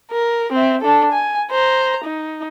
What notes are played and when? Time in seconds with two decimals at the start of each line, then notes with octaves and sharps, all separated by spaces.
0.12 A#4
0.52 C4 E5
0.81 D4 A4
1.12 G#5
1.51 C5 A#5
2.04 D#4